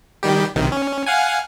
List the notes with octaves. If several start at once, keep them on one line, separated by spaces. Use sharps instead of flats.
D#3 G3 G4
B1 C3 D#3
C#4
F5 F#5 G#5